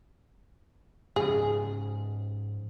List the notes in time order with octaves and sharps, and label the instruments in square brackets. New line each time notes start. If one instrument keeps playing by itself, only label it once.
[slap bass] G#2 C#3 F3 [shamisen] G#4